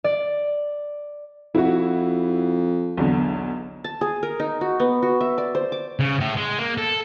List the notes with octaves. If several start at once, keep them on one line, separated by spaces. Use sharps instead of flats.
D5
F2 E4 F#4
B1 E2 D3
A5
G#4
A#4
D#4
F#4
B3
F#4
E5
D5
C5
D6
C#3
A2
G#3
A#3
A4